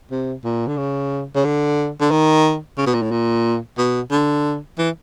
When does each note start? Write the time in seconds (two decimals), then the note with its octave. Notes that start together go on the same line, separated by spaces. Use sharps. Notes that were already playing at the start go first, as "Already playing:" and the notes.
0.11 C3
0.44 A#2
0.68 D3
0.78 C#3
1.35 C#3
1.45 D3
2.01 D3
2.11 D#3
2.78 C#3
2.86 B2
2.94 A#2
3.02 A2
3.11 A#2
3.78 B2
4.11 D3
4.78 E3